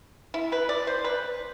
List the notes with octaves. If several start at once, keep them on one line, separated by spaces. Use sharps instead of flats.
E4
B4
D5
C5
B4